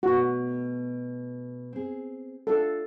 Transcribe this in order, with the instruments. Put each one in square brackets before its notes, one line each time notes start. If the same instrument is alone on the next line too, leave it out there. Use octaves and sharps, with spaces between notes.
[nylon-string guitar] B2 A3 [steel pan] F#4
[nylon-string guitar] C4 G#4
[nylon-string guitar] D4 F4 [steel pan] A4